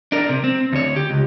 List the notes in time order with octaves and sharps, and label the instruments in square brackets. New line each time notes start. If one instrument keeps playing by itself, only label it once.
[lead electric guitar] D4 A#4
C3
C4
D2 C#5
G4
C#2